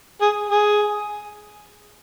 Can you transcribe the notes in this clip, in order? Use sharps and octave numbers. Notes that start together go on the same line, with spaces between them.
G#4
G#4